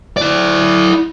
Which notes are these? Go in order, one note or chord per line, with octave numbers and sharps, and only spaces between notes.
E4 D5